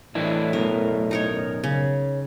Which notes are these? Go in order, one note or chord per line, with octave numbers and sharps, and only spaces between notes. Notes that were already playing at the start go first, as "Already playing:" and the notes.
A2 E3 D4 E4
F#2 B2 A#4
D#4 A#4 C#5
C#3